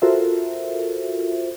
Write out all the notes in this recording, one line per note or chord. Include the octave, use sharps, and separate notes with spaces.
F4 F#4 A4 A#4 C5 E5